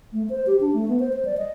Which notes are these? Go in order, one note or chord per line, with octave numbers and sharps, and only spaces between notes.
A3
C5
G4
D4
A3
B3
C5
C5
D5
D#5